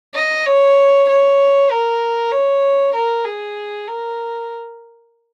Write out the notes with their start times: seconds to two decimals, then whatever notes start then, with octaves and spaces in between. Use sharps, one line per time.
0.15 D#5
0.46 C#5
1.09 C#5
1.71 A#4
2.32 C#5
2.94 A#4
3.25 G#4
3.88 A#4